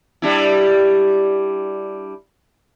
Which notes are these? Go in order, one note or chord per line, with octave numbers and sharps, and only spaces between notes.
G3 D4 E4